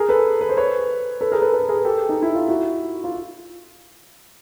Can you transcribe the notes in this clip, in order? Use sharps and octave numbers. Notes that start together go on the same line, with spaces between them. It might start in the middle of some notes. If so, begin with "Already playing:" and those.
Already playing: G#4 A#4
A4 B4
B4
C5
B4 C#5
A4 B4
G#4 A#4
A4 B4
A4 B4
G#4 A#4
G4 A4
D#4
E4
F4
E4 F#4
F4